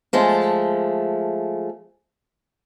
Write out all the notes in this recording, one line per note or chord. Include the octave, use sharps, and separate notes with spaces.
F3 G#3 A3